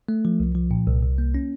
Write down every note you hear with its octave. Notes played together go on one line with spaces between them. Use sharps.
A3
F3
C2
F3
A#2
C2
C2
A#3
C#4